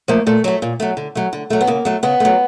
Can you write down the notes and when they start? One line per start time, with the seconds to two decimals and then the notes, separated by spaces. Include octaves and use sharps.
0.08 F3 A3 A#3
0.27 A#2 A3
0.44 F#3 A3
0.62 A#2
0.80 F#3 A3
0.97 D3
1.15 F#3 A3
1.33 D3
1.50 F#3 A3
1.61 B3
1.67 C#3 A#3
1.85 F#3 A3
2.03 C#3 B3
2.20 F#3 A3